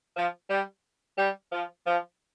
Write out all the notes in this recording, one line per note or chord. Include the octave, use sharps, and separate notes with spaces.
F3
G3
G3
F3
F3